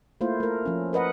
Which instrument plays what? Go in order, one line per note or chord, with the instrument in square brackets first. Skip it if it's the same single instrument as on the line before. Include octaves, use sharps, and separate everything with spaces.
[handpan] A3 A#3 E4 F4 C5
A3 A#4
F3 C#4
A#4 B4 D#5 F#5